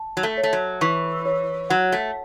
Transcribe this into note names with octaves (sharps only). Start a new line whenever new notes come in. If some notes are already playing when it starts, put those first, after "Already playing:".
Already playing: A5
F#3
A3
C#5
A3
F#3
E3 C#6
C#5
F#3 F#5
A3